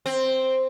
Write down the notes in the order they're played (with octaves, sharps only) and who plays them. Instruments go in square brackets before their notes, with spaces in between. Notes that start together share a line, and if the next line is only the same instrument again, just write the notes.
[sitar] C4